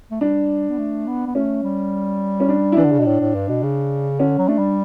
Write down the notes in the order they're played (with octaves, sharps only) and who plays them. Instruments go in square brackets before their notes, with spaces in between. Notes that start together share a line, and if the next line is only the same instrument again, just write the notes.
[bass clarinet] A3
[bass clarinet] G3 [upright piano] D4
[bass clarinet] B3
A3
B3
B3
[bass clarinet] A3 [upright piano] C#4
[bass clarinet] G3
[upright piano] C#4
D4
E4
[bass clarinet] E3 [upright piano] D4
[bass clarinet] D3
C#3
B2
A2
A2
G2
B2
C#3
[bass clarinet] D3 [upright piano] C#4
[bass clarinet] F#3
[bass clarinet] A3 [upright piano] D4
[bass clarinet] G3